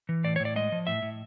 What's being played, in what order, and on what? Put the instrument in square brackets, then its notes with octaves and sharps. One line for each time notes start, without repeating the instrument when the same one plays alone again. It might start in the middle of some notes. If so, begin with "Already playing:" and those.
[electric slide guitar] E3
A2 D5
C#5
A2
D5
G#3 D#5
F3
A2 E5
A2